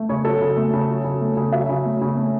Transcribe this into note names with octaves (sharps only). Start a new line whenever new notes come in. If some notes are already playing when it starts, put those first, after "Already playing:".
Already playing: A3
C#3 C#5
F#3 A4
C#3
A3
C#3
F#3
C#3
A3
C#3
F#3 E5
C#3
A3
C#3
A3